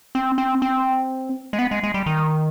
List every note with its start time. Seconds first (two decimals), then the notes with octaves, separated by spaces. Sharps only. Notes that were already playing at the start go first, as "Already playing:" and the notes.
0.15 C4
0.38 C4
0.62 C4
1.53 G#3
1.59 B3
1.71 G#3
1.83 G#3
1.94 G3
2.06 D#3